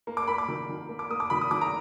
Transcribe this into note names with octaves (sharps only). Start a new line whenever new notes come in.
A#3
D6
A#3 B5
D6
D#3
D#3
A#3
D6
A#3 D#6
D6
D#3 B5
D#6
D#3 D6
A#5